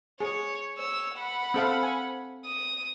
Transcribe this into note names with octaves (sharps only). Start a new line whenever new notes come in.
G#4 C#5
C#5 E6
F#5 B5
C4 A4 F5
G#5
D#6